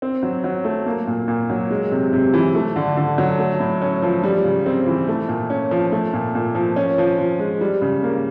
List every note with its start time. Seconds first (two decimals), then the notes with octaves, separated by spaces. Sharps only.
0.02 C4
0.23 F#3
0.44 F#3
0.65 A3
0.86 A#3
1.07 A#2
1.28 A#2
1.50 F#3
1.70 G#3
1.92 C3
2.13 C3
2.34 E3
2.55 A3
2.76 D3
2.97 D3
3.18 F#3
3.39 A3
3.60 A2
3.82 C#4
4.02 F3
4.24 G3
4.45 C#3
4.66 C4
4.87 E3
5.08 A3
5.29 A#2
5.50 C#4
5.71 F3
5.92 A3
6.13 A#2
6.35 A#2
6.55 F3
6.76 C#4
6.98 F3
7.18 F3
7.39 G#3
7.61 G3
7.81 C#3
8.03 A#3